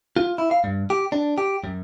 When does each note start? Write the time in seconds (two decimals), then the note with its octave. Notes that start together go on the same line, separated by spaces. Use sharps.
0.17 F4
0.38 E4
0.51 F5
0.64 G2
0.90 G4
1.12 D4
1.38 G4
1.64 F#2